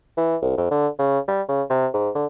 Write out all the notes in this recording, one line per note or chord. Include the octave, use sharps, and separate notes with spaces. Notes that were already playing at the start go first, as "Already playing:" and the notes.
E3
C2
F2
D3
C#3
G3
C#3
C3
G#2
D3